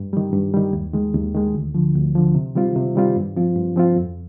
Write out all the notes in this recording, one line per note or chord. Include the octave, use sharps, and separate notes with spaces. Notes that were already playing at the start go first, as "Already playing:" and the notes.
Already playing: G2
D#3 G3
G2
D#3 G3
D#2
D#3 G#3
D#2
D#3 G#3
D2
D3 F3
D2
D3 F3
C3
D#3 G3 C4 F4
C3
D#3 G3 C4 F4
G2
F3 C4 F4
G2
F3 C4 F4
F2